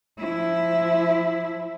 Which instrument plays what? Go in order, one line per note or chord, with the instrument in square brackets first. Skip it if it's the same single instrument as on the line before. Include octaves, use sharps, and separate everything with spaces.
[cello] F3 E4